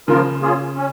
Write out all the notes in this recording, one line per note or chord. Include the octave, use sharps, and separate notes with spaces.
C#3 F3 A#3 F4 A#4
A#3 C#4 F4 G#4
C#4